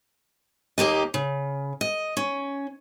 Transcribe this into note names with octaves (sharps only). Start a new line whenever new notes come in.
D#2 A#3 G4 D#5
C#3
D#5
C#4